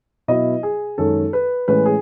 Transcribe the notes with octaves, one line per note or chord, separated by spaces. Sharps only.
B2 F#3 B3 E4 D#5
G#4
F#2 D#3 G#3 C#4 A4
B4
A2 E3 G#3 C#4 B4
G#4